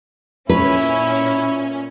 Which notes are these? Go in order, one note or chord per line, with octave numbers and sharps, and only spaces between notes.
A#2 C#4 E4 B4